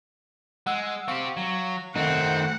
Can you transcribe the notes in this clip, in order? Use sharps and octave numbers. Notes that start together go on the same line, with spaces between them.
G#3 F#5 E6
C4 G4 F5 C#6
F#3
D#3 A3 C4 D#4 F#5